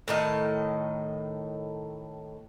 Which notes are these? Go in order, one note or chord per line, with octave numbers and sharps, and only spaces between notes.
A2 D#3 D#5